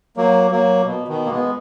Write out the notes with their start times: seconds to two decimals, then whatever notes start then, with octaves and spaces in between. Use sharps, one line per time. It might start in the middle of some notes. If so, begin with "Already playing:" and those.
0.17 F#3 A#3
0.51 F#3 A#3
0.85 B2
1.08 B2 D#3
1.25 A#3
1.30 G#3 B3